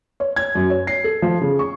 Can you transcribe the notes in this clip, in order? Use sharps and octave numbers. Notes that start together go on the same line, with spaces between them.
C#5
G#6
F#2
C#5
C7
A4
F3
C#3
C#6